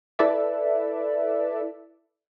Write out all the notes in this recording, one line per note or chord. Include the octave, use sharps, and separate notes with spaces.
E4 A4 B4 D5 E5